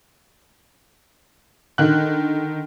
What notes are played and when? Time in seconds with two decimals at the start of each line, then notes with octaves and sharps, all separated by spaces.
1.78 D3 D#3 F#6